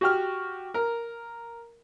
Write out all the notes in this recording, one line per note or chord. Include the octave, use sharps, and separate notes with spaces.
F#4 G4 F6
A#4